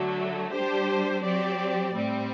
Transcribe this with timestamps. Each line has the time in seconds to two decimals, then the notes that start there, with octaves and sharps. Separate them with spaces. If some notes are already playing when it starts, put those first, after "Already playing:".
Already playing: D3 F#3 A3
0.53 G3 D4 G4 C5
1.24 F#3 C4 G4 D5
1.94 A2 G3 C4